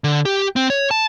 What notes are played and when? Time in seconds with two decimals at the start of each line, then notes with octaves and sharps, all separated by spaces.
0.04 D3
0.25 G4
0.56 C4
0.70 C#5
0.91 A5